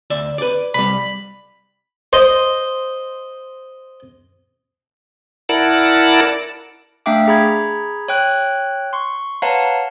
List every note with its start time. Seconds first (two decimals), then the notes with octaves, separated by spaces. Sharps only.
0.10 D2 D5 E5
0.38 B4 D5
0.75 C2 G3 B5
2.13 C5 D#5
5.49 E4 A#4 D5 F#5 A5
7.06 A3 D4 E5 F5 G5 D6
7.28 G#4 A#5 B5 G#6
8.08 C#5 G5 F#6
8.93 C6 C#6
9.42 B4 C#5 F5 F#5 A5 A#5